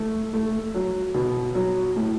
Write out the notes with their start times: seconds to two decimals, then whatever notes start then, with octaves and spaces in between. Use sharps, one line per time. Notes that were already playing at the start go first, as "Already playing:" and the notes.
Already playing: A3
0.34 A3
0.74 F#3
1.14 B2
1.55 F#3
1.96 A2